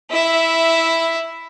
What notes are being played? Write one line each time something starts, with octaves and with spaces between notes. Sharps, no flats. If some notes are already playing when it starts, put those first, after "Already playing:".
E4 E5